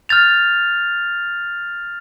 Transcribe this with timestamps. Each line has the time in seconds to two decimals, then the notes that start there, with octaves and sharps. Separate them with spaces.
0.09 F6 G6 A6 F7